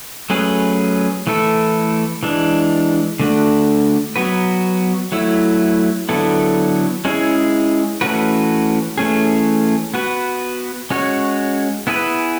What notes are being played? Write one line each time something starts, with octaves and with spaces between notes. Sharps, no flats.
F#3 A3 C#4 G#4 B4
E3 A3 E4 A4
E3 G#3 D4
D3 A3 D4 F#4
F#3 B3 F#4 B4
F#3 A3 E4
D3 F#3 B3 E4 A4
G#3 C#4 E4 G#4
E3 A3 C#4 F#4 B4
E3 A3 C#4 G#4
B3 F#4 B4
G#3 C#4 F#4 C#5
B3 E4 G#4 B4